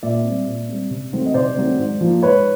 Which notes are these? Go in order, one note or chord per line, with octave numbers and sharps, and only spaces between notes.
A#2 D5 E5
G3 C4
A#2
G3 C4
C3
D#3 F#3 A3 C4
D#5
C3 C5 D5
D#3 F#3 A3 C4
G#2
F3 A#3
G#2 B4 C#5